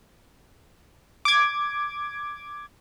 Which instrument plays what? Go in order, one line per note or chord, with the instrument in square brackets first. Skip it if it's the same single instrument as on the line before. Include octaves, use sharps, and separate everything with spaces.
[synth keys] D6 G#6